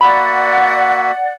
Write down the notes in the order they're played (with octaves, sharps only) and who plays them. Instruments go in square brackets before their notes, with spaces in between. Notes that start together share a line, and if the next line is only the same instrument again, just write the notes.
[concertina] A#3 F#4 E5 [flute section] D5 F#5 [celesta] B5